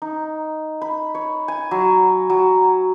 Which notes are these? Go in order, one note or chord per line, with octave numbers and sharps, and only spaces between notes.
D#4
B5
C#5
G#5
F#3
F#3